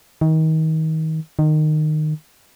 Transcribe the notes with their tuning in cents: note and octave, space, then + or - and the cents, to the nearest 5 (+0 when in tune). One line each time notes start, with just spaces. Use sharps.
D#3 +30
D#3 -20